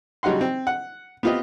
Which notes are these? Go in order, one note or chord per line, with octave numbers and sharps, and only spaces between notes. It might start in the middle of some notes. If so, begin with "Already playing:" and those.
C#3 F#3 G3 D#4 F#5 C6
C4
F#5
B3 C4 F4 G4 D#5